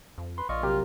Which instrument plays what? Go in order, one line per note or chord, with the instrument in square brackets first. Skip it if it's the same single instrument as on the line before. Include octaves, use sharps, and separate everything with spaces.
[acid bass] F2
[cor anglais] B4 [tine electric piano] C6
[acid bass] A#1 [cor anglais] F4 [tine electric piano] D5 D#5 C#6
[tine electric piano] C3 F#3 A#4 [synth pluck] G4